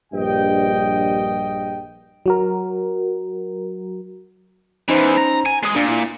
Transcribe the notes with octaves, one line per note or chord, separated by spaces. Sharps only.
A#1 G2 D#5 G5
F#3 F#4 A#4
E2 E3 C#4 D#4 C5
A#5
G#5
G#3 G#4
A#2 D4
E4